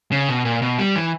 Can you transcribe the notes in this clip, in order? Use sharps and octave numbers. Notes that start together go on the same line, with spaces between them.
C#3
B2
A#2
B2
G3
E3